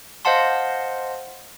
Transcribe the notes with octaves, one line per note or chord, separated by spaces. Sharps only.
C5 D#5 F5 F#5 A5 C6